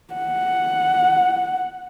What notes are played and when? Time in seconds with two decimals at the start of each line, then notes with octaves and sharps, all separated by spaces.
0.14 F#5